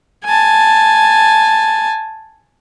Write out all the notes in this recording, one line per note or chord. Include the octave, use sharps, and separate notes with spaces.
G#5 A5